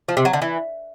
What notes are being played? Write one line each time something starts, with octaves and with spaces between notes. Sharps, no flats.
F3
C3
F#3
D3
E3